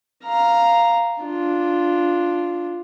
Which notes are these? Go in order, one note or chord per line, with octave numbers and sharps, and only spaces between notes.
F5 A#5
D4 F4